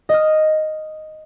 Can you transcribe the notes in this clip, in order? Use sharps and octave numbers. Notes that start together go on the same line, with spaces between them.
D#5 F6